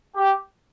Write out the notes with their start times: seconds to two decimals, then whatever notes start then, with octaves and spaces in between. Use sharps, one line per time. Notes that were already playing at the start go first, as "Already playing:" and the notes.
0.17 G4